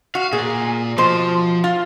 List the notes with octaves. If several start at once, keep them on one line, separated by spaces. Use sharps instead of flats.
F#4 F5
A#2 G#4
B2 F3 C5
F4